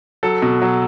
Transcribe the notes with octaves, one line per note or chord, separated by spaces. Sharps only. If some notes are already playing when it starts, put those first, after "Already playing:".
F#3 A4
B2
F#3